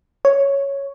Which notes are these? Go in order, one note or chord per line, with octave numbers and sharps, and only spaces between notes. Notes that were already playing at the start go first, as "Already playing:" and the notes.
C#5